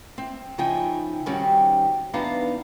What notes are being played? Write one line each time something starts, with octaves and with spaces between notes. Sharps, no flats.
C4
C#3 F3 D#4 E4 G5 G#5
D#3 G3 C4 C#4 F#4 G4
E2 B3 D4 D#4 F5 A#5